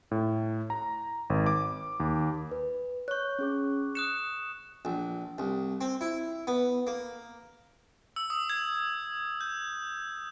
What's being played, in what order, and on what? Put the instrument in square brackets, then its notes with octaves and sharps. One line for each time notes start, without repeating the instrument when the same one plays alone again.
[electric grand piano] A2
A#5
G#1
D6
D#2
[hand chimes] B4
[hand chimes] C#5 G6 [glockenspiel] C#6 F#6
[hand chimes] C#4 G#4 D6
[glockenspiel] D#6 F#6 E7 [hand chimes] C#7
[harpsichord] A#1
C2
C4
E4
B3
A#3
[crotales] E6
D#6
G#6
G6